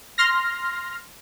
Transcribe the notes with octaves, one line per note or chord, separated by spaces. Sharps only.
C6 F6 A#6